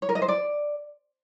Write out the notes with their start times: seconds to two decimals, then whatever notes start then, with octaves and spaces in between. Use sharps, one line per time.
0.02 C#5
0.09 A#4
0.15 D#5
0.22 C5
0.28 D5